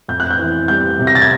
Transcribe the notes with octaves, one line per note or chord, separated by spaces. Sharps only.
F2 G6
F#6
G6
E3
G3 G6
C3
A#6
A6
G#6